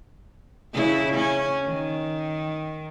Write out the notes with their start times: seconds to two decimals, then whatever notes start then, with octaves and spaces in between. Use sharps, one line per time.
0.74 C#3 E4
1.14 C#4
1.65 D#3